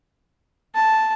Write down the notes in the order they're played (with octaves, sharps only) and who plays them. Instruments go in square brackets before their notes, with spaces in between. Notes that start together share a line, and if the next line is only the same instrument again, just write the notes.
[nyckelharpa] A5